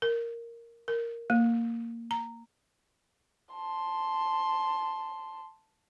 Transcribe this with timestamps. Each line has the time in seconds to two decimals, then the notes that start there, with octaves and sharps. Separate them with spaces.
0.02 A#4
0.88 A#4
1.30 A#3
2.11 A#5
3.55 A5 C6